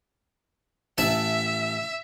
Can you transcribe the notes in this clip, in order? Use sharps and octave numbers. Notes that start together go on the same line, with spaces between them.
A1 E4 E5 A5